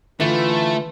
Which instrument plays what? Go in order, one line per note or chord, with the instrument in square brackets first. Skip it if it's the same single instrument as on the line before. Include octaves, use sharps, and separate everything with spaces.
[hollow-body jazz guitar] D3 [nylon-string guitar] E3 [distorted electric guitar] A3 [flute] F4